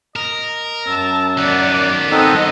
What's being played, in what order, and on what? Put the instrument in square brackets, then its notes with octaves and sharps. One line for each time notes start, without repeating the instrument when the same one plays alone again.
[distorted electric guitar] A#4 [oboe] D#5
[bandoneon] F#2 [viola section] A5 [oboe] E6
[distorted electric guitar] D#3 B3 [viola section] D5 [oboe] F#5
[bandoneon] C4 D#4 A4 [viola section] D#5 [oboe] F#5